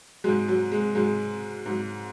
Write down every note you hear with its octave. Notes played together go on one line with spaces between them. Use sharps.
G#2 F#3 G#3
F#3
G#3
G#2 F#3 G#3
G#2 F#3